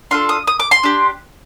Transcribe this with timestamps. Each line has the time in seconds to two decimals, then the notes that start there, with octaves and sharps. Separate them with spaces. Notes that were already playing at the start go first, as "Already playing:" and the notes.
0.11 D4 F4 A4 C6
0.29 D#6
0.47 D#6
0.60 D6
0.71 C6
0.83 D4 G4